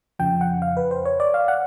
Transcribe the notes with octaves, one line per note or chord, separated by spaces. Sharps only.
F2 C#3 F3 G5
F#5
F5
B4
C5
C#5
D5
F5
F#5